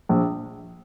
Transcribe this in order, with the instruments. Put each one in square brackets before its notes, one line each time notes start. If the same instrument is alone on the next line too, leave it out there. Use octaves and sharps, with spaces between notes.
[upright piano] A#1